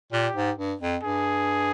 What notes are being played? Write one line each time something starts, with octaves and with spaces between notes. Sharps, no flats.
A#2 G4
G#2
G2
F2
G2 G#4